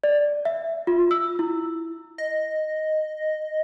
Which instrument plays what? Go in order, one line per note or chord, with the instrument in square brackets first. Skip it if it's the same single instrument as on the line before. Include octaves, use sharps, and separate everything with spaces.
[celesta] D5
E5
F4
E6
E4
[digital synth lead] D#5